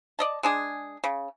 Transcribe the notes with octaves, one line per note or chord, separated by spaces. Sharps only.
D5 D#5 A5
G#3 D4 G#4
C#3